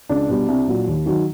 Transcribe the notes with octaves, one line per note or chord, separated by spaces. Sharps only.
C#2 D4
B2 G3
C2
A#2 F#3
D#2
D#3 F#3